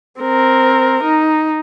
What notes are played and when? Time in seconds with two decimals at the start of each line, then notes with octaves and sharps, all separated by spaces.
0.21 C4 A#4
1.04 D#4